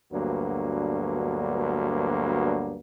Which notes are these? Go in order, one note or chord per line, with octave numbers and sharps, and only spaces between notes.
D2 G2 F#3 A#3 B3